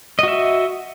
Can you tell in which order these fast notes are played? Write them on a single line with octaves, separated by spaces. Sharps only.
D#5 F#4 E5